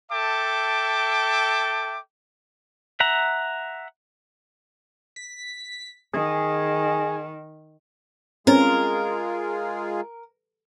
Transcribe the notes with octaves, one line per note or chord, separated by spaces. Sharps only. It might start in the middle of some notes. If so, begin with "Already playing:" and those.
A4 E5 G5 A5 D6
E5 F#5 A#5
B6
D#3 G#4
G#3 C4 C#4 F4 G#4 A#4